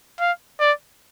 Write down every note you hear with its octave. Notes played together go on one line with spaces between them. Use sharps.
F5
D5